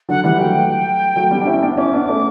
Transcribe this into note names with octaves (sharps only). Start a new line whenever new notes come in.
D3 F#3 F#5
E3 G3 F#5
F#3 A3 G5
F#3 A3
G3 B3
D4
C#4 E4
B3 D4
C#4 E4 D6
B3 D4
A3 C#4